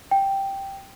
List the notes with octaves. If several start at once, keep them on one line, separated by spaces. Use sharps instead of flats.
G5